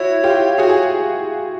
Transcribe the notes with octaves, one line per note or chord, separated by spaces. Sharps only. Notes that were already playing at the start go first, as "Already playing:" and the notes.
Already playing: E4 F#4 C#5
F4 G4
F#4 G#4
G#4